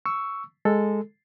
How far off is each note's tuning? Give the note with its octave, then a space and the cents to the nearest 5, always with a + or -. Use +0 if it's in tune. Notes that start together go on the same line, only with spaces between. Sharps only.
C#6 +10 E6 +0
G#3 +0 A4 +0